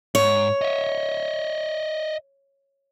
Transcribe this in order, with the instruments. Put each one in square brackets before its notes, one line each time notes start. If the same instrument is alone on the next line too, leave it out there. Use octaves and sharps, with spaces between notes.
[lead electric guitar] G#2 [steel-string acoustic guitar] C#5
[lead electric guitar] D#5 E5